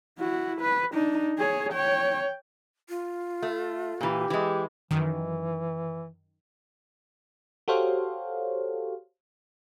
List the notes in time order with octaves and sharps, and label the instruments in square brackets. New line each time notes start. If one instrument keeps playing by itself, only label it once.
[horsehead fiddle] E4 F#4
B4
D4 D#4
G#4 C#5
C#5 G5
[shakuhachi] F4
[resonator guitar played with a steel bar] A3
[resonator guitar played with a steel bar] A#2 E3 [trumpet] G4
[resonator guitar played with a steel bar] E3 G#3
[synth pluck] F#2 D#3 [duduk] E3
[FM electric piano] F#4 G4 A4 C5 C#5 F5